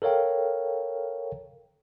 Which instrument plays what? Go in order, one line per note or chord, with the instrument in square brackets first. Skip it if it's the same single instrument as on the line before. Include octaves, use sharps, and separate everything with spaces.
[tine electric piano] A4 A#4 C#5 F5 G5